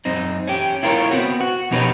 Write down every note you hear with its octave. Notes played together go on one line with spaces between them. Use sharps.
F#2 C4 D#4
C#4 G4
E4 F4 A#4 C5 C#5
B3 C4 F#4
F#4
F2 B2 D#4 G4 B4 C#5